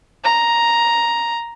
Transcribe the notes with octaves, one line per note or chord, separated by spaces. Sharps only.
A#5